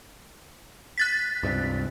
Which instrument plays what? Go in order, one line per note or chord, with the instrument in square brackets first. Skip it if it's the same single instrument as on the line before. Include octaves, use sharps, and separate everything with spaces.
[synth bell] F#6 A6 B6
[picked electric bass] C#2 G2 C3